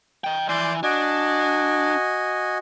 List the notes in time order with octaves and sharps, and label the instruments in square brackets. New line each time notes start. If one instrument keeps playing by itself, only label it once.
[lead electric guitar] D#5 G5
[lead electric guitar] E3 [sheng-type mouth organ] D5 C6 G6
[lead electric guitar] D4 [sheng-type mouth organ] F#4 D#5 G#5